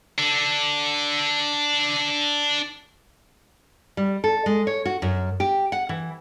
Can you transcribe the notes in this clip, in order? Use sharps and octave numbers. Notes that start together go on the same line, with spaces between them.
D4 A4
G3
A4
G#3
C#5
F#4
F#2
G4
F#5
E3